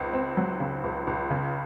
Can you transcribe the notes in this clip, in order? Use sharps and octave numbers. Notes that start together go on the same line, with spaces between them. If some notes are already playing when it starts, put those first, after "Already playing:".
Already playing: C#2 C4
C4
F#3
C#3
C#2
C#2
C#3